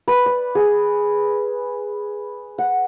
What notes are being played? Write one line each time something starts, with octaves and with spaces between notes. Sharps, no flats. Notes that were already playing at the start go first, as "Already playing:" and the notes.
B4
D5
G#4
F#5